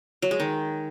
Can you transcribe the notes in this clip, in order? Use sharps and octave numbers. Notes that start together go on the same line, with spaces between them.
F#3
G#3
D#3